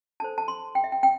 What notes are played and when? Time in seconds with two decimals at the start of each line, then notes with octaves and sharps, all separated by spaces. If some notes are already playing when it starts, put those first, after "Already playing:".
0.20 D4 A4 C5 A5
0.38 A5
0.48 C6
0.75 G5
0.84 E5
0.92 G5
1.03 G5